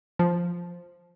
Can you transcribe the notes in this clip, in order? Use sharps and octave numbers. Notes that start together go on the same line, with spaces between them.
F3